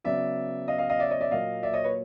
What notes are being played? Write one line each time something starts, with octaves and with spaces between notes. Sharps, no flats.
C#3 F#3 B3 D5 E5
D#5 F5
D#5 F5
D#5 F5
D5 E5
C#5 D#5
D5 E5
A#2 F#3 A#3 D#5 F5
D5 E5
C#5 D#5
B4 C#5